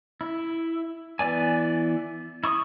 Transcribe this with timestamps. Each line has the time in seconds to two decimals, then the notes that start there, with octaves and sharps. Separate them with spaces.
0.21 E4
1.19 E3 B3 D5 G#5
2.44 E4 C#6 D#6